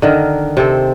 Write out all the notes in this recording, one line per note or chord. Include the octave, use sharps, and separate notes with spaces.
D3 D#3 A#4
C3 C4 A4